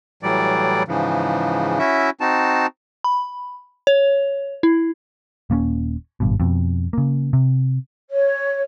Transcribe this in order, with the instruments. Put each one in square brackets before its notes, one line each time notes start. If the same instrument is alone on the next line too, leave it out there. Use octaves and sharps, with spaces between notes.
[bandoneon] A2 E3 F#3 G3 D5
G#2 C#3 E3 F3
C#4 E4 F#4 E5
C4 D#4 F#4 A5
[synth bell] B5
C#5
E4
[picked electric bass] D#1 A#3 B3 C#4
G#1 G2 B2
F2 B2
C#3 A#3
C3
[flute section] C#5